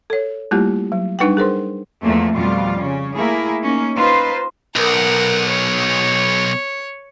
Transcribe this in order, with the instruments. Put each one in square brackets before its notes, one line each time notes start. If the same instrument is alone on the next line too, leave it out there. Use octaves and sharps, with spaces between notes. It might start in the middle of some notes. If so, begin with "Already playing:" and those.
[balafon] A4 C#5
G3 A3 A#3 E4 F4 G4
F#3
G3 D4 D#4 B4 F#5 G5
G#4 A#4 C5 C6
[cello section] E2 F3 A3 A#3
F2 B2 G3 A3 F4 F5
C#3 C#4
A3 A#3 E4 G#4
A#3 C#4 D#4
D#4 F4 B4 C5
[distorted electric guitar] B1 [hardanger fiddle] A#4 F#5
[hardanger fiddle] C#5